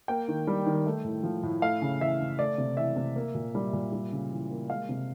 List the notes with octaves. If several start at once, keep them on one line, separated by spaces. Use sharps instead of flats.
A#3 G5
D#3
G3
D#3
A3
A2
F3
A2
A3 F5
C#3
E3 E5
C#3
A3 D5
C3
E3 E5
C3
A#3
A#2
G3
A#2
G3
C#3
E3
A#3
G#3 F5
C3